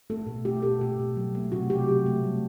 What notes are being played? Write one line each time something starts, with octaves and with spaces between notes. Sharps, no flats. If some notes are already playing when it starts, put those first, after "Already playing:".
A3 A4
B2
A3 G4
B2 A4
B2 G4
B2
F#3
A3
C3 F#4
C3 G4
F#3
A3
G3